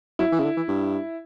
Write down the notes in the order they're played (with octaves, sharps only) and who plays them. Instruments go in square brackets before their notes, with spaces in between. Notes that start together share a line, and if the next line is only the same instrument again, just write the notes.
[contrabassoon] F#3 [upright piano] E4
[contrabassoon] E3
C#3
D3
E3
G2